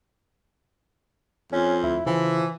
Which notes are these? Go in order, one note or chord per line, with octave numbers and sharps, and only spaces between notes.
F2 C#4
D2 E4
C#3 E3 F3